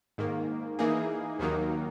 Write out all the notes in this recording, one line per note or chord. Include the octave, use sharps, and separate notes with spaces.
G#2 D#3 A#3
E3 A#3 D#4 G#4
D#2 D#3 F#3 A#3 D#4